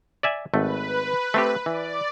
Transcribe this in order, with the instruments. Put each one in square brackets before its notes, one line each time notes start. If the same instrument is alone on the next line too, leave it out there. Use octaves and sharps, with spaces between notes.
[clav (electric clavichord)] D5 E5 G#5
[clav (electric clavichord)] G#1 A3 [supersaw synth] B4
[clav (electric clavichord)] A3 C4 G4
[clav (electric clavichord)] E3 [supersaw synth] D5